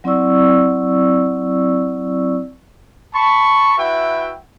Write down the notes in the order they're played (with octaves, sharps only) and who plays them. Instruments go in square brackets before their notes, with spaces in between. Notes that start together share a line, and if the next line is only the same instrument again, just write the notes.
[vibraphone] F#3 C4 E4 D5 C#6 E6
[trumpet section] A5 B5 C#6
E4 F#4 B4 E5 F#5 G5